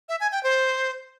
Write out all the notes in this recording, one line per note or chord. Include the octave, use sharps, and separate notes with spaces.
E5
G#5
G5
C5